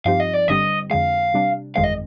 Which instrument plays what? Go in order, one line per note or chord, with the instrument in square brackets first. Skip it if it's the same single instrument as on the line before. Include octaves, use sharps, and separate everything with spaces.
[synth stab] G2 F3 C4 D#4 G4 [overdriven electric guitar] F5
[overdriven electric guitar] D#5
D5
[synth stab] G1 G2 D3 G3 C4 [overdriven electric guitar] D#5
[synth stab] F2 D3 G#3 [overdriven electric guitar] F5
[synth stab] C3 G3 D4
[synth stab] G1 F2 D#3 G#3 C4 [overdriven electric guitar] F5
[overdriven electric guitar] D#5